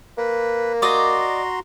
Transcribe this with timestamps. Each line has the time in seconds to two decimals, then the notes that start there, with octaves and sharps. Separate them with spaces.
0.18 A#3 B4
0.82 F#4 D5 D#5 A#5 C6